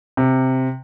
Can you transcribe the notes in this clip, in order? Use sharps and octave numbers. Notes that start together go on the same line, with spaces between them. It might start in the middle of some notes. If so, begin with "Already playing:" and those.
C3